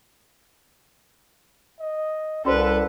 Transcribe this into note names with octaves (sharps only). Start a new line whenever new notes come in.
D#5
C2 C#4 F#4 A4 B4 C5 D5